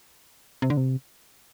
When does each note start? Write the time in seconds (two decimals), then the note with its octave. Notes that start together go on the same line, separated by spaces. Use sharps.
0.62 C3
0.70 D3
0.77 C3